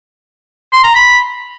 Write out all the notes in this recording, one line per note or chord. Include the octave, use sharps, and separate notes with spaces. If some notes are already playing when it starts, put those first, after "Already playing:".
C6
A#5
B5